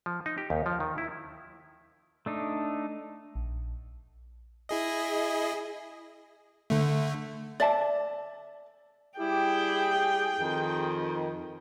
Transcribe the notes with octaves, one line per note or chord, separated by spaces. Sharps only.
F3
D#4
G4
D#2
F3
D#3
E4
A3 D4 D#4
A#1
E4 G#4 D#5
D3 A3
D5 E5 A5
G3 E4 G4 G#4 G5
F2 D#3